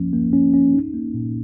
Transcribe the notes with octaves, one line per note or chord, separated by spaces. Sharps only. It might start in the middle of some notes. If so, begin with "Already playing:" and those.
Already playing: F3 A#3 C#4
A#3
C#4
C#4
D#4
A#3
A#2